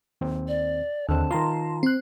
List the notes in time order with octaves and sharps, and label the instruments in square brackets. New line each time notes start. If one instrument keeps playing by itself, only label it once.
[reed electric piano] D#2 C4
[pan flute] D5
[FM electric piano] D#2 [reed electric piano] D3 C4 [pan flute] A5
[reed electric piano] D#3 F4 [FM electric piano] A#5 C6
[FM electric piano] C4 F#6